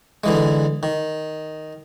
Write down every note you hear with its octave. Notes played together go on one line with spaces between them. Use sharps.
D3 E3 G#3
D#3